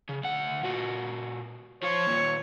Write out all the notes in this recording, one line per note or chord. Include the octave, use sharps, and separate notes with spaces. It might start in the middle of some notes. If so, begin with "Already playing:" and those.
C#3
D2 F#5
A#2 F#4
F3 F4 C#5
D#2 A#2